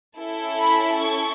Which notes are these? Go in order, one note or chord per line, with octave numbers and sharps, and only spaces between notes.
C#4 E4 A4
B5
C#6